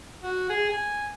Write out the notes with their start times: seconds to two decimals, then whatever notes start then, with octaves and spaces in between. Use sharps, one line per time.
0.23 F#4
0.50 G#4
0.70 G#5